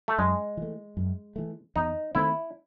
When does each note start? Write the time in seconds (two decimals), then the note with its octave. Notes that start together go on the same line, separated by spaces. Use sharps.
0.08 A3
0.18 F#2 G#3
0.57 E3 A3
0.97 F#2
1.36 E3 A3
1.76 E2 D#4
2.15 D#3 A3 C4 E4